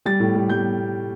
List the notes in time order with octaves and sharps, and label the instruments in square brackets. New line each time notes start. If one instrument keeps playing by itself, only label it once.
[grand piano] G3 A6
A2
G3
G3 G6